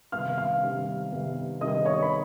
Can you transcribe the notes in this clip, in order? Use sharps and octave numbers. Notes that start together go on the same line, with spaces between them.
C3 D#3 G3 B3 F5 F6
F5 F6
C3 D#3 G3 B3
C3 D#3 G3 B3
C3 D#3 G3 B3 D#5 D#6
C#5 C#6
B5